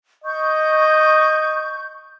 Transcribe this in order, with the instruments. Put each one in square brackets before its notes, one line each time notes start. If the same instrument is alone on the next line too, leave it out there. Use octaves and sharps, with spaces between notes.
[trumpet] D#5 [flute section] C#6 G6